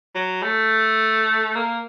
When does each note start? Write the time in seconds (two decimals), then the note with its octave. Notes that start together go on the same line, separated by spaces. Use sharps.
0.15 F#3
0.42 A3
1.55 A#3